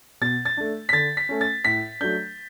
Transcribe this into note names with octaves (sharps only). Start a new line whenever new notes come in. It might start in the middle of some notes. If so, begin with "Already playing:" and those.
B2 A6
A6
A3 D4
B6
D3 A6
B6
A3 C#4
A6
A2 B6
F#3 A3 D4 G6